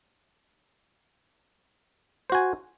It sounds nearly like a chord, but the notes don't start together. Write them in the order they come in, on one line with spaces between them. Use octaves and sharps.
C5 F#4 G#5